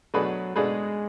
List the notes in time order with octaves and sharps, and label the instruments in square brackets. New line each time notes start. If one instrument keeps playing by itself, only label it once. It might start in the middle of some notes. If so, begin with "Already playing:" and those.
[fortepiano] B2 A3 D4 G#4 B4 [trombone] F#3
[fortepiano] B2 A3 D4 G#4 B4 [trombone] G#3